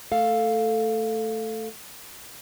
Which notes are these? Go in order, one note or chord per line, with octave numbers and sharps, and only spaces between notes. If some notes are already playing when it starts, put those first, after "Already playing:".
A3 A4 F5